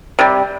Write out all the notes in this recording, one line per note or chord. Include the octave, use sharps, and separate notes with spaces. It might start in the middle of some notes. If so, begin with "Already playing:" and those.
C3 G3